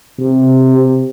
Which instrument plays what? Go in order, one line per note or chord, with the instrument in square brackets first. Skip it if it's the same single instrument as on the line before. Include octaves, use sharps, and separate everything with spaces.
[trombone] C3